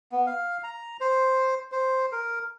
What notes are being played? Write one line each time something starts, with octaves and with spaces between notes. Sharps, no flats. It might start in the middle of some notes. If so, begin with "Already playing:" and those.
B3
F5
A#5
C5
C5
A#4